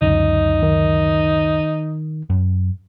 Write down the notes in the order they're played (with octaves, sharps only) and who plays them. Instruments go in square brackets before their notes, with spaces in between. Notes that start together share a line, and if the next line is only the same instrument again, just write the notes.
[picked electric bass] C#2 F#2 D3 [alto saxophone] D#4
[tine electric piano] D#3
[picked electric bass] F#2